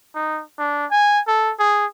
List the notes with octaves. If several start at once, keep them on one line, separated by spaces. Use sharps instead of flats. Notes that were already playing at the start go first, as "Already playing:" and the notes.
D#4
D4
G#5
A4
G#4